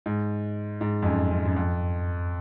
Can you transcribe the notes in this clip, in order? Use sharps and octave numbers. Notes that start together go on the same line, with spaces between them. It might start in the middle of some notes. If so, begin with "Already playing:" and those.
G#2
G#2
F2
F#2
F#2
F#2
F2